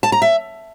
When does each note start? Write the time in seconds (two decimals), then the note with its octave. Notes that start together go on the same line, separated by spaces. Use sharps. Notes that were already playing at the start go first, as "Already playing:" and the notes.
0.03 A5
0.12 A#5
0.22 E5